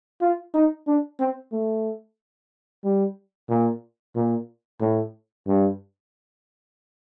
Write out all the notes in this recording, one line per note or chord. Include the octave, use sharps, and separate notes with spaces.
F4
D#4
D4
C4
A3
G3
A#2
A#2
A2
G2